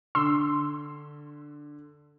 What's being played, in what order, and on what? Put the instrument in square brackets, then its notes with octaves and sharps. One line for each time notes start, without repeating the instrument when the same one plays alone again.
[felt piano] D3 [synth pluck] C6 E6